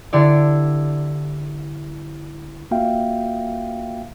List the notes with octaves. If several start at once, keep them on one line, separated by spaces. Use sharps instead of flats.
D3 D4 E4 G4 D5
A#3 F4 F#4 E5 F5 G5